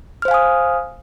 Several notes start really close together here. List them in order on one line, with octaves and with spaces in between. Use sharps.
F6 C5 F5 G#5 D#6